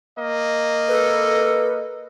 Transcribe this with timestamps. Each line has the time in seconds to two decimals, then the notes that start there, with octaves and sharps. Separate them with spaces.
0.19 A#3 D#5
0.89 A4 B4